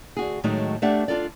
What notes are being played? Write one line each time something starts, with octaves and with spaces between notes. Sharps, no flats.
D2 F#4 G#4
A2 D#3 F#3 G#3 A3 D#4
A3 D4 G4 E5 F#5
D4 F4 A4 D5